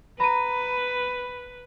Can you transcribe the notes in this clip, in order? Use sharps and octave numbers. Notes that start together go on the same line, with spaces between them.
B4 A#5 B5 D#7